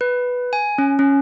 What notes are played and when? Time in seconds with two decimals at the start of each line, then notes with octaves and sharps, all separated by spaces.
0.01 B4
0.53 G#5
0.78 C#4
0.99 C#4